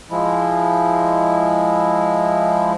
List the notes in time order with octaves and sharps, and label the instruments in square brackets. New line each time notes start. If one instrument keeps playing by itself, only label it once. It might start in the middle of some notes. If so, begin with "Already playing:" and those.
[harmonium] F3 G#3 E4